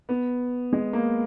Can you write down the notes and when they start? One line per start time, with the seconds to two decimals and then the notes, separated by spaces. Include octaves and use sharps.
0.09 B3
0.73 G#3
0.93 A#3